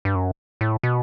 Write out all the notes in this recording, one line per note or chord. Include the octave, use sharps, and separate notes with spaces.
G2
F#2
A2
B2